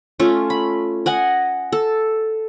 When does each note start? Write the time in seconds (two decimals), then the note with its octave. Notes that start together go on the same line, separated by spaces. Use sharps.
0.20 A3 C#4 F4
0.50 B5
1.06 D#5 F#5 G#5
1.72 A4